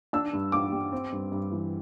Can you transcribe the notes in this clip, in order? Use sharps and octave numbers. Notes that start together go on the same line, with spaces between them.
D4 E6
G2
G2 D6
G3
C4
G2
G2
E3